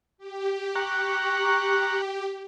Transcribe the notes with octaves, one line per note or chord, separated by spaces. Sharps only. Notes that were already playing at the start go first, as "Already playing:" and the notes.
G4
A#5 C#6 F#6